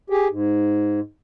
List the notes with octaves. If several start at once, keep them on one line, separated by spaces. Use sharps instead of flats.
G4 G#4
G#2